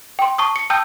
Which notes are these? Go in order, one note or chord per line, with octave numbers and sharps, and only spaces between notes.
G5 C6
A5 C#6 D#6
C#7
G5 A5 D#6 E6 G6